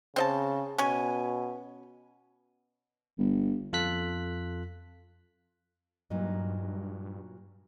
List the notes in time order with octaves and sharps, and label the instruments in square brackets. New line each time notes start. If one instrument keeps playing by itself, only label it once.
[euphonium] C#3 [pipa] C4 D#5 A5
[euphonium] B2 [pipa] C#4 G#5
[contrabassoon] G1
[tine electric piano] F2 F4 A4 F#6 B6
[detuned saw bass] G2 [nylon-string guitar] A#2 F#3 D#4